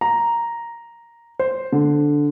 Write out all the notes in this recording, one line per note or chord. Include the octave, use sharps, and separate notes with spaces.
A#5
C5
D3